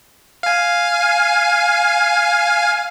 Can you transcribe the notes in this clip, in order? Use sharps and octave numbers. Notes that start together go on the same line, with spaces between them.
F5 G#5